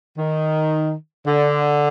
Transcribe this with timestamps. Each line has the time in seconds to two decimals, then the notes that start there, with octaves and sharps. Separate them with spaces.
0.18 D#3
1.26 D3